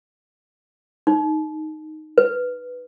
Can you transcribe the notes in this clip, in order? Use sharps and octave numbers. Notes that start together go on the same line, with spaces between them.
D#4
B4